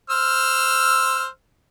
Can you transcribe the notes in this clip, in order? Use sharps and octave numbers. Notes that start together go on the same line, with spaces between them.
C5 E6 F6